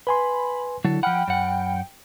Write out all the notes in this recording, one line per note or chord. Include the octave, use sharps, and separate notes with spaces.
B4 G#5 B5 C6
D3 F#3 E4 A4
F3 F#5 G5 B5 F6
F#2 F#5